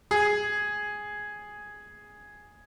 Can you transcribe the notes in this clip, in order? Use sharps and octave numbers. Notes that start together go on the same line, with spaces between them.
G#4